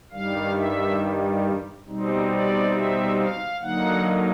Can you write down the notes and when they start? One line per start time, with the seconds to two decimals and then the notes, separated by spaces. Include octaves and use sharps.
0.11 G2 D#3 G3 F5
0.55 E5
1.86 B2 G3 C4 D#4
2.30 D5
2.73 E5
3.18 F5
3.61 D3 F#3 A#3 D#4 F#5